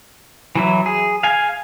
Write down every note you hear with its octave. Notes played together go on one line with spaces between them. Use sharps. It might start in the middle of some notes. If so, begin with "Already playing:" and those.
E3 F#3 E4
G#4
F5 G#5